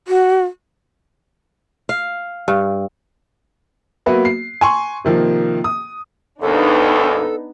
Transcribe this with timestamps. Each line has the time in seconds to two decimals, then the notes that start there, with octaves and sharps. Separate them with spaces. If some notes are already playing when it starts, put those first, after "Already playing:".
0.08 F#4
1.89 F5
2.48 G2
4.06 F#3 A#3 B3 F#4 B4 E5
4.25 C7
4.61 G#5 C6 C#6
5.05 C3 D#3 F3 A#3
5.64 D#6
6.42 G#1 D#2 B3 D4 D#4 A4